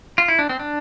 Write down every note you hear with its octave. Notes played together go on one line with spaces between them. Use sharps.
F4
E4
D4
C4
D4